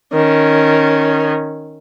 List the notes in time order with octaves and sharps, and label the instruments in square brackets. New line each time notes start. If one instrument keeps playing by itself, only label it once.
[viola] D#3 C#4